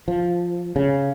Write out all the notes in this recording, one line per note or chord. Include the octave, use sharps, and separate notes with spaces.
F3
C#3